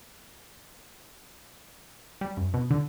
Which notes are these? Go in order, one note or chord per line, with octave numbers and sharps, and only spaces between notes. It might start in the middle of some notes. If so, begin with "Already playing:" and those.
G3
F#2
B2
D3